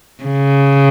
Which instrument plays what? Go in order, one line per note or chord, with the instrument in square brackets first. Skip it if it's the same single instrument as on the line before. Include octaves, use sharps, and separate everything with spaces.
[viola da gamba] C#3